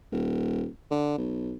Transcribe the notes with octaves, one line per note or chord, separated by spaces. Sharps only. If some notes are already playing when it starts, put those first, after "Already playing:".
D#1
D3
B1